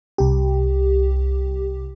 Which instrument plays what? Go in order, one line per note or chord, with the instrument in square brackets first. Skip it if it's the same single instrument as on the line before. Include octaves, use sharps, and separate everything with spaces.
[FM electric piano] C2 G4